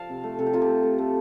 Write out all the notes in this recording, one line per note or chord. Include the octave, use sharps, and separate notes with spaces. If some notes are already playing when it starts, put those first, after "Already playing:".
Already playing: F3 F5 A5
C3
A3
C3 A4
G4
C3 F4
G4
A3
A3
A3